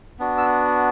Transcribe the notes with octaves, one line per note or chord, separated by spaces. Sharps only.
B3 D4 F#4
E6